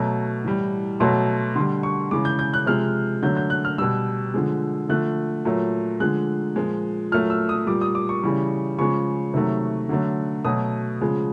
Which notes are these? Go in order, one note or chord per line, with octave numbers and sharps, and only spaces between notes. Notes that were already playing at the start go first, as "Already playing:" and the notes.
Already playing: B2 F#3 A3 A#5
A2 E3 G3
B2 F#3 A3 C6
D3 G3 C6
C#6
C#3 E3 G#3 D6
G6
G6
F#6
C3 F3 G#3 F6
D3 F#3 A3 G6
G6
F#6
F6
B2 G3 E6
D3 F3 G#3
D3 F3 A3 F#6
A#2 F#3 A3
D3 F3 G#3 F#6
A#2 F3 G#3
A#2 F#3 A3 F6
E6
D#6
A#2 G3 D6
D#6
D6
C#6
C#3 E3 G3
C#3 F3 G#3 C#6
C3 D#3 F#3 A3
D3 F#3 A3
B2 F#3 A3 D#6
C#3 F3 G#3